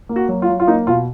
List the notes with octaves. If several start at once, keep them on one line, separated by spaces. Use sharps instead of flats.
A#3
F#4
F#3
F4
F#3
F4
A#3 D#4
B2 F4